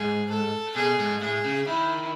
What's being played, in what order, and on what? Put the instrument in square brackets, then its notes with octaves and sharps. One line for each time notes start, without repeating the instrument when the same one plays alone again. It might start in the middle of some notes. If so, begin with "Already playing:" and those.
Already playing: [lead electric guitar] G#2 [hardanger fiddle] G#4
[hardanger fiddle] A4
[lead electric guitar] B2 [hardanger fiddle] G#4
[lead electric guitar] G#2
[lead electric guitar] A2 [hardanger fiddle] G#4
[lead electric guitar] C#3
[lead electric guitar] D#3 [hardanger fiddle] E4